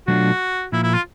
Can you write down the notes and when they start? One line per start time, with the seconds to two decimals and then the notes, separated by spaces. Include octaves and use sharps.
0.08 B2 F#3 A3 D4 F4 F#4
0.72 A#2 F3 A#3 E4
0.83 E4
0.94 F4